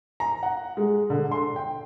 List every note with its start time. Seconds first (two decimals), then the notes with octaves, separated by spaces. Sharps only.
0.20 A#5
0.43 F#5
0.77 G#3
1.10 D3
1.31 C6
1.56 G5